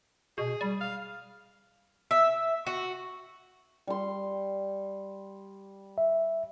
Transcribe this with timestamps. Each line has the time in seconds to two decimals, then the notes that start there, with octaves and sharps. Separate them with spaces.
0.38 B2 G#4
0.61 G3
0.81 F5
2.11 E5
2.67 F#4
3.87 G3 C6
5.98 E5